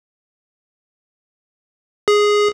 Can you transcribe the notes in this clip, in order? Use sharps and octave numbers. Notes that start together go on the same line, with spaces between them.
G#4